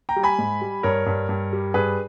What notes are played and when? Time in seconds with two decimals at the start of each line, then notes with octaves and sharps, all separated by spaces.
0.09 G5 A#5
0.16 G3
0.23 G#5 B5
0.39 G#2
0.61 G3
0.83 G2 A#4 C#5
1.06 G2
1.29 G2
1.53 G3
1.74 G2 G#4 B4